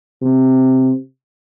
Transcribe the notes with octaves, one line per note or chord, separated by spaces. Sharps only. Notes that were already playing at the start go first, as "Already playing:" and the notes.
C3